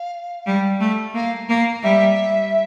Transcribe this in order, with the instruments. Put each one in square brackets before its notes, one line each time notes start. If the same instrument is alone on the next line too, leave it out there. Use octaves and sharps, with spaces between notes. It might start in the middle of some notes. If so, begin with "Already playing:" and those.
Already playing: [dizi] F5
[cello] G3
A3
[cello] A#3 [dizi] F5
[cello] A#3
[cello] G3 [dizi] E5